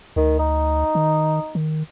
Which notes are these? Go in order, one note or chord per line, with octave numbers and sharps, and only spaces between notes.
D2 D#3
D#4
D#3
D#3